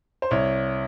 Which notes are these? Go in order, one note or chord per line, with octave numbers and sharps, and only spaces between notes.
C5
C2 C#5